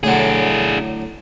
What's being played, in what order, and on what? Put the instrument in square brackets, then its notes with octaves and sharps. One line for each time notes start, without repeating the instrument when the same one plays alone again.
[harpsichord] A2 D3 F#3 [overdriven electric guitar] D4 G#4